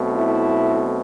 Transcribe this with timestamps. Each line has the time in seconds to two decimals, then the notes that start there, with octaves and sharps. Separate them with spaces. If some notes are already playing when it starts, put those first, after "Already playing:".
Already playing: B1 B2 A3 C4
0.14 E4